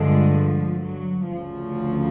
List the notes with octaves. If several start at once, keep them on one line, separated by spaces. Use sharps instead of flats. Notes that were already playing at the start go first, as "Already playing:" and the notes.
Already playing: G2 D3 F3 G#3
F3
F#3
D2 C#3 F3